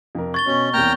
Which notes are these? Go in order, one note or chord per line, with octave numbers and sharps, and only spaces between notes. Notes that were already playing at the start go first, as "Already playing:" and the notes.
F2 C3 A#4
C#6 G#6 A6 G7
B2 C#4
E2 C3 A#3 G5 A#5 F6 G6